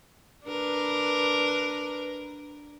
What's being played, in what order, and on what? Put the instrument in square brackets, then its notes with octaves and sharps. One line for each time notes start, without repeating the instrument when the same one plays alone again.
[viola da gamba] D4 A#4 B4